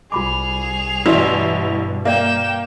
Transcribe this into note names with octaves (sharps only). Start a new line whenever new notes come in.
C2 F4 G#4 B5 D6 F7
A1 G2 B2 E4 F#4 D5
A#3 A#4 D5 E5 G5 E7